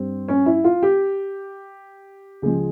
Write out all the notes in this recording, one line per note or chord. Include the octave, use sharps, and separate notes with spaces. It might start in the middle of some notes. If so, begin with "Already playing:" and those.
Already playing: G2 G3 C4
C#4
E4
F4
G4
C#2 C#3 F3 G#3 G#4